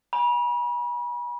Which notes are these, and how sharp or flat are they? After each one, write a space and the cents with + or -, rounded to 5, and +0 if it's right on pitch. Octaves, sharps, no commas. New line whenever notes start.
G#5 -10 B5 -40